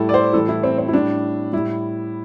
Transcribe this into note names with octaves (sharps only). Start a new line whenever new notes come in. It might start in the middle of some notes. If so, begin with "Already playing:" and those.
Already playing: A2 G3 E4 A4
D5
C5
A2 E3 G3 A4
E4
C4
C4
E4
A2 G3 D4
A2 G3 E4